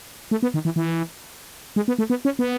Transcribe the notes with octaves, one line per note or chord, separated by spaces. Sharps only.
A3
B3
D#3
E3
E3
G#3
B3
A3
B3
C#4
B3